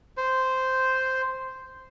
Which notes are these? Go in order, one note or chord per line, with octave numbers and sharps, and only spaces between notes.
C5 C6